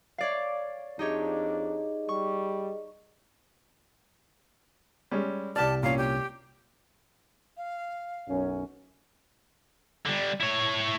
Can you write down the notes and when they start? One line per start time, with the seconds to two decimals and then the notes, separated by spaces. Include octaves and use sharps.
0.18 C#5 D5 F5
0.99 F2 D4 D#4 G4 G#4 C#5 D#5
2.09 G3 C#6
5.11 G3 G#3 C#4
5.56 C2 G4 D5 A5 F6
5.83 A#2 C#4 F5
5.98 G4
7.57 F5
8.28 B1 F#2 C#4
10.06 D3 G3
10.41 E4 C#5